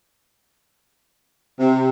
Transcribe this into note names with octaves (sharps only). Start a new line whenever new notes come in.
C3